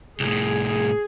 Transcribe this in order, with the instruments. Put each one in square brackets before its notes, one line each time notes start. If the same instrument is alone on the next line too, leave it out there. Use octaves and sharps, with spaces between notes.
[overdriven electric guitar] C2 A2 [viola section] G#4